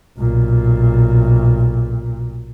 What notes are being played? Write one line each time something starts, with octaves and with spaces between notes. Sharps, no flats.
B1 A#2